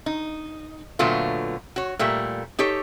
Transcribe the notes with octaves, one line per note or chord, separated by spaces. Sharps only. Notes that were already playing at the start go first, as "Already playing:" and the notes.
D#4
A#2 D3 F#3 A3 B3 F4
F#4 C#5
A#2 G3 A3 A#3
D#4 G4 A4 C#5